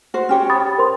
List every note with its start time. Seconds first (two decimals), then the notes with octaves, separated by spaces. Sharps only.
0.14 F#4 C5
0.29 C#4 G4 C#5
0.50 B5 D#6 A6
0.78 A#4 C5 C6